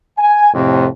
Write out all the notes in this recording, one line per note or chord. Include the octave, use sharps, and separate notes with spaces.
G#5
F2 A2 C3